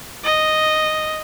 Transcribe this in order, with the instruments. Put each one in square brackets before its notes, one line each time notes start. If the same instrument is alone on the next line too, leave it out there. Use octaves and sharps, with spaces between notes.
[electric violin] D#5